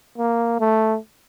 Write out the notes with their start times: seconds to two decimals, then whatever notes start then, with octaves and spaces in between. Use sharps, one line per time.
0.18 A#3
0.60 A3